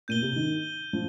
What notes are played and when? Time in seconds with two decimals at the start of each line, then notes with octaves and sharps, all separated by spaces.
0.08 A#2 G6 D#7 G7
0.22 C3
0.36 D#3
0.93 F3